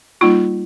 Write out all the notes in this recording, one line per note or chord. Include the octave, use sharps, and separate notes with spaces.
G3 A#3 D#4 F4